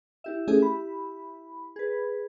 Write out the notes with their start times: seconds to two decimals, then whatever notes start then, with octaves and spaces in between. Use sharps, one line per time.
0.24 E4 G4 E5
0.48 A3 C#4 G#4
0.62 B5
1.76 G#4 B4